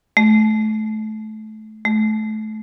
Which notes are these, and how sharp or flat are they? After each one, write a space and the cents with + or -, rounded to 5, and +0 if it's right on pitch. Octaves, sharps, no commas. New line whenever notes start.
A3 -25
A3 -25